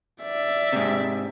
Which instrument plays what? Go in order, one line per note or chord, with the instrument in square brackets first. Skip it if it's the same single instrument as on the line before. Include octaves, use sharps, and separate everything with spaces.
[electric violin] D5 E5
[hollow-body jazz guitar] G#2 C3